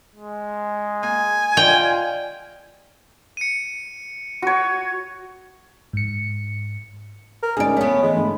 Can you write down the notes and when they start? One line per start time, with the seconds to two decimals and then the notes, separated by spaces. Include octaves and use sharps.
0.15 G#3
1.03 A#3 G#5
1.57 F4 D5 D#5 F#5 G5
3.37 C#7 D#7
4.42 F#4 C#5
5.93 G#2 C#7
7.43 A#4
7.57 D2 G#3 C#4 D#4 G#4 D5
7.77 A3 B3 C#4 C#5
8.02 E3 G#3
8.16 G#2 D3